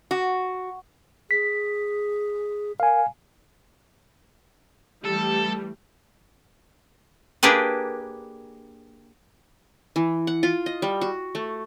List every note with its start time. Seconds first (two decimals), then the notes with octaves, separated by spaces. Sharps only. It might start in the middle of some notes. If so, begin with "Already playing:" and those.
0.11 F#4
1.31 G#4 B6
2.80 A#4 F5 G#5
5.05 E3 G3 A3 A4
7.43 A#3 D4 G4 G#4 B4
9.96 E3
10.27 F#5
10.43 F4
10.66 D#5
10.82 G3
11.01 F#4
11.35 A3